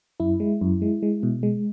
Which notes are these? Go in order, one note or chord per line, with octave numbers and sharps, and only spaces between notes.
F#2 E4
G#3
F#2
G#3
G#3
B2
G#3